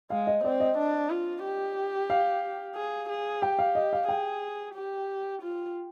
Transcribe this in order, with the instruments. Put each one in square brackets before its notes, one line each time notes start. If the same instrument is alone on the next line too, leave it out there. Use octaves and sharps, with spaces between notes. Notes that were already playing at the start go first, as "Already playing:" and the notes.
[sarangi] G#3 [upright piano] F5
[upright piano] D#5
[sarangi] C4 [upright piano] D5
[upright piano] D#5
[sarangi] D4
F4
G4
[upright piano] F5
[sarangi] G#4
G#4
[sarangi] G4 [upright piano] G5
[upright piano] F5
D#5
F5
[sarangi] G#4 [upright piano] G5
[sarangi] G4
F4